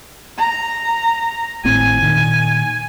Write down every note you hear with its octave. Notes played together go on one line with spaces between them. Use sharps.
A#5
G#1 A2 C4 G#5
A#2 D#3